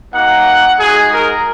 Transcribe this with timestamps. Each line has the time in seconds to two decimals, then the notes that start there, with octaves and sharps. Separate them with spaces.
0.12 A#3 D#4 F#4 F#5
0.79 G#3 D#4 F#4 G#4
1.12 A#4